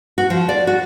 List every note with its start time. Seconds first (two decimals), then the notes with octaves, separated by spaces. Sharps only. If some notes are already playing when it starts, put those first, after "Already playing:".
0.18 F#4
0.30 F3
0.49 D5
0.67 F#4